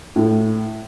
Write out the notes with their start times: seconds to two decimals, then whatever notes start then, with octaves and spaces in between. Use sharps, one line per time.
0.16 A2